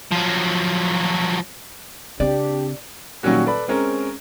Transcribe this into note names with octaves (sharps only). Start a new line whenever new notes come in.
F3 F#3
C#3 C4 D4 G4 D5
A#2 D#3 F#3 G3 C#4 F#4
A4 B4 D5 B5
G#3 C4 C#4 A#4